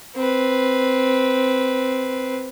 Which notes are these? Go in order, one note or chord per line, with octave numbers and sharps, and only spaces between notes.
C4 B4